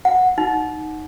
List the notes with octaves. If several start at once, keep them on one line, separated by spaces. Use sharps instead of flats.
F#5
D#4